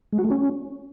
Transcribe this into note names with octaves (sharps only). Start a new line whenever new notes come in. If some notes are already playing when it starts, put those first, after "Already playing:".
G#3
F#4
A3
C#4